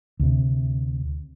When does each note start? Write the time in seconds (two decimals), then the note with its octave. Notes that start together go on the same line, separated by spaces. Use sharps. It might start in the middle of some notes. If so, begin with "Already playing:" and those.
0.20 D2 C3